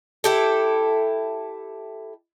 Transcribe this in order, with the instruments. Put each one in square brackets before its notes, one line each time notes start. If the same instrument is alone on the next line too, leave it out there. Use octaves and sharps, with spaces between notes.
[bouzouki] E4 G4 A4